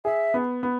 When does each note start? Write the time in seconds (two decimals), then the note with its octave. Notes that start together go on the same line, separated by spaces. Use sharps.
0.04 G#4 E5
0.34 B3
0.63 B3